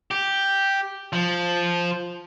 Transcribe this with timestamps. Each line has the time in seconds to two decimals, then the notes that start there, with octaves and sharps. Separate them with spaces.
0.11 G4
1.13 F3